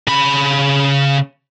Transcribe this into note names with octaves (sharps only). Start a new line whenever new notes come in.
C#3 B5